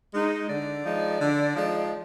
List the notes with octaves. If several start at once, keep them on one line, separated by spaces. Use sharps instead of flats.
G#3 D#4
D3 D5
F3 G#3 D#4
D3
F3 G#3 D#4